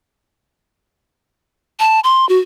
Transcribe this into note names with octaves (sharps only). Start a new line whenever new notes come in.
A5
C6
F#4